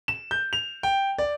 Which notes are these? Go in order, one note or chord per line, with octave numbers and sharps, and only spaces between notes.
E7
G6
F7
G5
D5